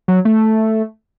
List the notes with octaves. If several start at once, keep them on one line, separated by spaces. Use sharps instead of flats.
F#3
A3